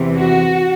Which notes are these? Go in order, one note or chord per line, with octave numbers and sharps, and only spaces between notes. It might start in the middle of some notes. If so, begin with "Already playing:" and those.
Already playing: E2 C3 E3
F#4